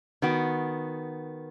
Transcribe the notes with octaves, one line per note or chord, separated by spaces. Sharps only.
D#3 B3 F#4